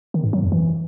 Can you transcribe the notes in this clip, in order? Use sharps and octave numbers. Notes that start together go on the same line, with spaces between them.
D#3
G#2
F#3
F2
E3